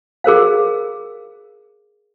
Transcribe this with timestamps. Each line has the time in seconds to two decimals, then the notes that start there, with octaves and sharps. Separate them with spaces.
0.24 G#4 A#4 C5 F5